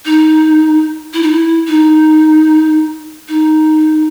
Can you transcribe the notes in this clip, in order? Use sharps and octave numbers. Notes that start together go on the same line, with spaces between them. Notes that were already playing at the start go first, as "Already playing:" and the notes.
D#4
E4
D#4
E4
D#4
D#4